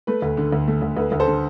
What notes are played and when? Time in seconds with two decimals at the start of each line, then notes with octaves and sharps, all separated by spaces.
0.07 A3 B4
0.22 D2
0.37 D3
0.52 D2
0.67 A3
0.82 D2
0.97 D2 B4
1.12 D2
1.20 A4 C5
1.27 D3